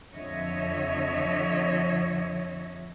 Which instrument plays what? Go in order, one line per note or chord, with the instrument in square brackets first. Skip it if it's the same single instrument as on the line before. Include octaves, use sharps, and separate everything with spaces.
[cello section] F2 D3 F3 C#5 D#5 E5